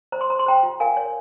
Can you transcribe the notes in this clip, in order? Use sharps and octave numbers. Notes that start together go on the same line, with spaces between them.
C5 A#5
C6
C5 A#5
C6
C5 G5 A#5
F4
A#4 F5 G#5
C#5